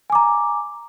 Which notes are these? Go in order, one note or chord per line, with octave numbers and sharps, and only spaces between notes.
G#5 A#5 D6